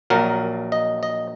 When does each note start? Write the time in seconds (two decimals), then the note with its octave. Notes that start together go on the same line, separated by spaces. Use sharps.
0.10 A#1 A#2 F#3 A#4
0.72 D#5
1.03 D#5